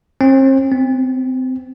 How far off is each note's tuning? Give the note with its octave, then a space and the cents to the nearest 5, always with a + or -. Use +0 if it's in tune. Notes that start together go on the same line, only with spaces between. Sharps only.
C4 +40
C4 -25